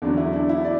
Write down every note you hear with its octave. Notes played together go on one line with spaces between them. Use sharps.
E2 D3 F#3 C#4 D4
E4
D4
E4
D5